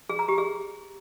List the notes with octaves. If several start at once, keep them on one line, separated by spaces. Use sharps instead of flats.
G#4
A#5
G4
G#4